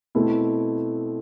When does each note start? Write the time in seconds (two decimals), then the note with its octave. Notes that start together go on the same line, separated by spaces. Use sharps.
0.15 B2 A3 C4 E4